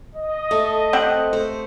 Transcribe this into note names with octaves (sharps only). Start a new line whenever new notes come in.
D#5
A3
C4 G4 F#5
A3 C5